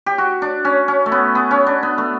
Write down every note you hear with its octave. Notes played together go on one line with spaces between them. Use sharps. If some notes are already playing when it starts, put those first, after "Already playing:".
G4
F#4
D4
C#4
C#4
A3
B3
B3
C#4
D4
B3
A3